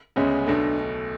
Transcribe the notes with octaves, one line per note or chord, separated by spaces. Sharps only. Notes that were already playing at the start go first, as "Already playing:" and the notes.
D2 C#3 G#3 B3 C#4
B1 B2 A3 D4